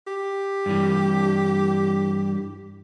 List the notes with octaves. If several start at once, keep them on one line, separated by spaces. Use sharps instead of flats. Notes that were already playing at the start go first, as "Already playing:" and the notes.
G4
G2 E3